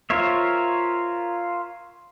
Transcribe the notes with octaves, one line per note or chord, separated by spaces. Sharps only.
F4 A#4 C5 C#5 E5